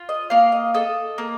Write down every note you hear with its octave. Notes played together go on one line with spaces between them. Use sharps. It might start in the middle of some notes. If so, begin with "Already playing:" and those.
Already playing: F4
D#5
A#3 F5
D#5
A4 D#5
A#3